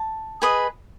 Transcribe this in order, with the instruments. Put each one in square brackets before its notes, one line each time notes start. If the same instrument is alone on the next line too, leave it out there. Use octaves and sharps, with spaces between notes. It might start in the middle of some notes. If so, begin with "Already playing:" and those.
Already playing: [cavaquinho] A5
G#4 B4 D#5